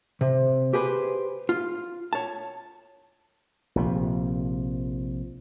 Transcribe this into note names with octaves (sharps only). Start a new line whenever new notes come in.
C3
G4 G#4 B4 C5
F4
C#5 A5
A#1 C3 F3